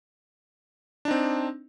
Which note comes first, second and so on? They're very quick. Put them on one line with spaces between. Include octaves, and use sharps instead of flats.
D4 D#4 C4